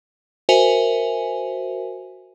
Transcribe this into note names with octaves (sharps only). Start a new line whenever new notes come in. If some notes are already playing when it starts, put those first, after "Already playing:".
F#4 A#4 C5 E5 G#5